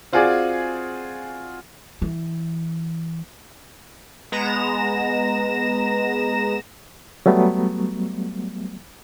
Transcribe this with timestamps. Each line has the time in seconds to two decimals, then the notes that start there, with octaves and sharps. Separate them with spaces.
0.13 C4 F4 F#4 G#4 D5 G#5
2.02 E3
4.32 G#3 B3 A#5 A#6 E7
7.26 F#3 G3 A3 B3